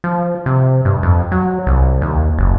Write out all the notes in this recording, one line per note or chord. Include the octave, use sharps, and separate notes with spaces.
F3
C3
G2
F2
F#3
C2
D#2
F#1